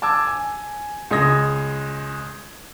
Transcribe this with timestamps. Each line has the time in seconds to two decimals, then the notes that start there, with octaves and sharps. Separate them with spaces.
0.02 A5 D6 E6 G#6
0.27 G#5
1.11 C#2 G#3 D#5 D#6 G#6 A#6